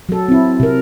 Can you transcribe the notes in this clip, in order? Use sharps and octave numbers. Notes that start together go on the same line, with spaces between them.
F#3 A4
C4 E4
C3 A#4